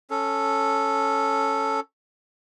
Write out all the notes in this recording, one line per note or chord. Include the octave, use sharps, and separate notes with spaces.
C#4 A4